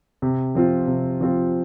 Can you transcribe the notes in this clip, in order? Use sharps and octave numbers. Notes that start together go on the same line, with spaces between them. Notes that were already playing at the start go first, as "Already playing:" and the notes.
C3
F3 C4 F4
C3
F3 C4 F4